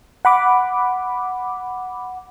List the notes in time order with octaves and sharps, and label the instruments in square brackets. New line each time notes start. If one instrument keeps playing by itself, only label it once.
[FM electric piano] F#5 B5 D6